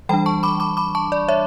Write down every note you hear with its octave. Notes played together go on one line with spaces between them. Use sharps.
E3 G3 D4 G5 B5
A5 C#6
B5 D6
B5 D6
B5 D6
A5 C#6
D5
C#5 E5